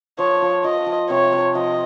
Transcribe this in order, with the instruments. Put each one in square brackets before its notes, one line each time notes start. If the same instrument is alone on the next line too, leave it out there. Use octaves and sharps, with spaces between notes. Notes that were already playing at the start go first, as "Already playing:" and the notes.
[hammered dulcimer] F3 [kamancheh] C#5
[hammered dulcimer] F3
[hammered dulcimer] F3 [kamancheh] D#5
[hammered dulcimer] F3
[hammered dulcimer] C3 [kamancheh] C#5
[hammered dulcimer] C3
[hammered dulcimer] F3 [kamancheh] D#5